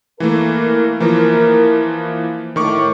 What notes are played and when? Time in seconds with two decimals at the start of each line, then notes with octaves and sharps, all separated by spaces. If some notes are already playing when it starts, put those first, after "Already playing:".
0.20 E3 A3 A#3 A#4
1.00 E3 F3 A#3
2.56 A2 D#3 C#6 D6